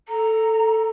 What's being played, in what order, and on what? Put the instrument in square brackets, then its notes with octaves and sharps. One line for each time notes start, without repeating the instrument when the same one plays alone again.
[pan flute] A4 [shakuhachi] A#5